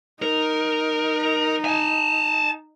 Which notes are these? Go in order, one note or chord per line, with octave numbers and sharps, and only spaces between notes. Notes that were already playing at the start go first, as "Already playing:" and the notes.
D#4 A#4
G#5 A5